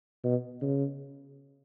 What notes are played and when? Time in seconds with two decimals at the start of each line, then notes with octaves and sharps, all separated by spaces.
0.24 B2
0.62 C#3